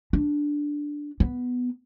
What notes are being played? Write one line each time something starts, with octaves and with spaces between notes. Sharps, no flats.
D4
B3